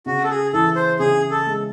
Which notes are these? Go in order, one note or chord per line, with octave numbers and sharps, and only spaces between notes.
C#3 F#4
A4
G#4
E3 A4
C5
C#3 G#4
A4
G#3